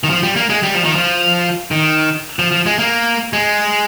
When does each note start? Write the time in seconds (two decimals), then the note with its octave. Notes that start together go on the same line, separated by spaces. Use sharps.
0.04 D#3
0.10 F3
0.23 G3
0.36 A#3
0.49 G#3
0.63 G3
0.75 F3
0.84 D#3
0.95 F3
1.71 D#3
2.39 F3
2.51 F3
2.66 G#3
2.79 A#3
3.33 G#3